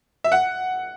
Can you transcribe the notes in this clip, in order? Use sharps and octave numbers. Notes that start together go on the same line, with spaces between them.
E5
F#5